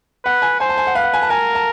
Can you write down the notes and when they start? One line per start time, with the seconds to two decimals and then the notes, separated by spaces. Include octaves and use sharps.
0.24 B4 F#5
0.42 G#5
0.60 C5 G#5
0.69 A5
0.77 G#5
0.87 F#5
0.95 B4 F5
1.04 F#5
1.14 G#5
1.22 A5
1.30 A#4 G#5
1.55 A5